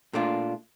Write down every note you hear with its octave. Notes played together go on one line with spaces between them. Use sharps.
A#2 A3 D4 F4